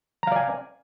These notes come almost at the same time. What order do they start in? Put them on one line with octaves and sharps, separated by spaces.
A#5 F5 D5 G#5